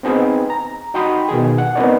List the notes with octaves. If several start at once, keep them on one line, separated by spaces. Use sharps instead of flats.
B3 C4 D#4 G#4 B4
A#5
D#4 F#4 G5 B5 C6 D#6
B2 D#3 G#4
F#5
B3 C4 D#4 A#4 C#5 D5